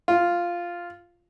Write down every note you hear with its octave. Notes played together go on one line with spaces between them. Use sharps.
F4